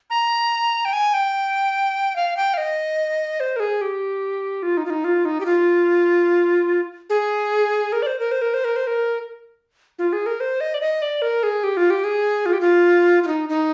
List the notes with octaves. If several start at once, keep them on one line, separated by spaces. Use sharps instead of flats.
A#5
G5
G#5
G5
F5
G5
F5
D#5
C5
A#4
G#4
G4
F4
D#4
F4
D#4
F4
D#4
G4
F4
G#4
A#4
D5
C5
A#4
C5
A#4
C5
A#4
C5
A#4
F4
G#4
A#4
C5
D#5
D5
D#5
D5
A#4
G#4
G4
F4
G4
G#4
F4
G4
F4
F4
D#4
D#4